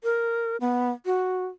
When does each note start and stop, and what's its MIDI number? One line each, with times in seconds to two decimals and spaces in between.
0.04 0.57 70
0.61 0.90 59
1.06 1.45 66